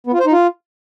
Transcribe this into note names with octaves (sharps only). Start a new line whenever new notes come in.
B3
F4
C5
D#4
F4